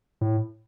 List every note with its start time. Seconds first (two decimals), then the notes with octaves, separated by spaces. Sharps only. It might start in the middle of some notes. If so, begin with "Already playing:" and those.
0.21 A2